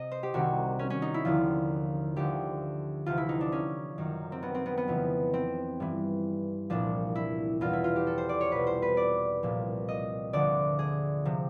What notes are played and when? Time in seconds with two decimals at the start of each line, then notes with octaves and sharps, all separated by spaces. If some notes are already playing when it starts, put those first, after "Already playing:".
Already playing: C3 D#5
0.11 C5
0.23 G4
0.34 C2 C3 D#3 F#4
0.79 C#4
0.90 C#4
1.02 D#4
1.14 E4
1.25 D#2 D3 F3 F4
2.16 D2 D3 F3 G4
3.06 D2 C3 E3 F4
3.18 E4
3.29 D#4
3.41 D4
3.52 C#4
3.98 F#2 D#3
4.32 C4
4.43 B3
4.54 C4
4.66 B3
4.78 B3
4.88 F2 C#3 E3
5.34 C4
5.80 G2 E3
6.70 C2 A#2 F3 D4
7.15 E4
7.61 E2 B2 F4
7.73 E4
7.84 F4
7.96 G4
8.07 A4
8.18 C5
8.29 D5
8.41 C#5
8.52 C2 B2 B4
8.67 C5
8.82 B4
8.97 D5
9.43 C2 A#2 F3
9.88 D#5
10.33 D2 D3 F3 D5
10.79 G#4
11.25 C3 F3